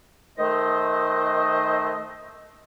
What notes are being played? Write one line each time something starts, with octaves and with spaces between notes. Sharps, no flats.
D#3 A3 C5 D#5